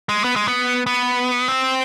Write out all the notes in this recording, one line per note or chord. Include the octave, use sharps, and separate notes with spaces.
G#3
B3
G#3
B3
B3
C4